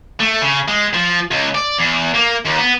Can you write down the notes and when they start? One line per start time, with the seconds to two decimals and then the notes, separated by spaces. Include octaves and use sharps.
0.20 A3
0.41 C#3
0.68 G#3
0.94 F3
1.31 C#2
1.55 D5
1.78 E2
2.14 A#3
2.45 D#2
2.58 B3